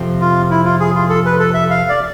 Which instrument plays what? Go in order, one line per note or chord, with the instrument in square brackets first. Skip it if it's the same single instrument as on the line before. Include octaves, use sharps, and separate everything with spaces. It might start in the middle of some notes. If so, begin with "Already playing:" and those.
Already playing: [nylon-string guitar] F2 C3 F3 A3 C4
[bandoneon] F4
E4
F4
G#4
F4
A4
B4
A4
E5
F5
D5